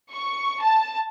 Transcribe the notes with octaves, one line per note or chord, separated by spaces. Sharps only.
C#6
A5